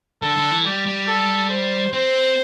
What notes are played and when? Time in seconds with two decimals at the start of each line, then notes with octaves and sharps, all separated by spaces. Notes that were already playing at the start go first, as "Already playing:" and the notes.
0.22 D3 A4
0.37 D3
0.51 E3
0.65 G3 G4
0.86 G3
1.07 A4
1.50 C5
1.93 C4 C5